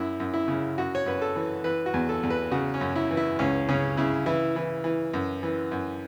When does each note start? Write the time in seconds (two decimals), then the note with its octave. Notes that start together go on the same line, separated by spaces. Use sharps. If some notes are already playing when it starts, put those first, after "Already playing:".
Already playing: F#2 E4
0.20 F#2
0.34 E4
0.48 C#3
0.78 F#2 F#4
0.95 C#5
1.06 F#2 B4
1.22 A4
1.36 E3
1.64 E3 B4
1.86 F#4
1.94 E2
2.09 A4
2.23 E2
2.30 B4
2.51 C#3 F#4
2.74 C#4
2.81 F#2
2.96 E4
3.11 E3
3.17 E4
3.39 C#2 C#4
3.69 C#3 C#4
3.97 C#3 E4
4.26 E3 E4
4.56 E3
4.84 E3
5.14 F#2
5.43 E3
5.71 F#2